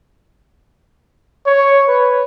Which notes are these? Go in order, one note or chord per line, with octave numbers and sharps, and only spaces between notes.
C#5
B4